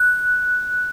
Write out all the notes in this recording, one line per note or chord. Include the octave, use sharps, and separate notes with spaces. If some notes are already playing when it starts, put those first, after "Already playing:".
Already playing: F#6